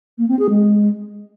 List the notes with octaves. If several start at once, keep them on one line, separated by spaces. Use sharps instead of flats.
A#3
C4
G#4
G#3